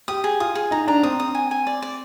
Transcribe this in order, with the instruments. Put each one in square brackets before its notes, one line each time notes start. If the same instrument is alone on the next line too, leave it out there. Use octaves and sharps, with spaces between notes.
[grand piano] G4 [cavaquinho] D#6
[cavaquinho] G#4
[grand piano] F4 [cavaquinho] D#6
[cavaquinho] G#4
[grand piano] D#4 [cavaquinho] A#5
[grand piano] D4 [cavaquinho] A#5
[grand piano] C4 [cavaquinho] D#6
[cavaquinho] D#6
G#5
G#5
D5
D5